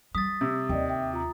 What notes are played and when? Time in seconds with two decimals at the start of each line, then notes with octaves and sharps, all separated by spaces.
0.15 G3 D#6 A6 B6
0.41 C3 E6
0.69 D#2 D5 D#5 G5
0.89 E5 G5
1.13 F4 A#5